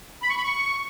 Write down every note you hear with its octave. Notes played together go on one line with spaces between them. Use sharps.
B5
C#6
B5
C#6